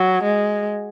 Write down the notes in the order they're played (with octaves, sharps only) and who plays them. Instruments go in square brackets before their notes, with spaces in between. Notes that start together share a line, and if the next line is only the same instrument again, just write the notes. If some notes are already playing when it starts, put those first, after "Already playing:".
Already playing: [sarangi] F#3
G#3